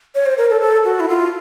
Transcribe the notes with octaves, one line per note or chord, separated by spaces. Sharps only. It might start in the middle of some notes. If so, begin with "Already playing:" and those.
C#5
C5
A#4
A4
A4
F#4
E4
F4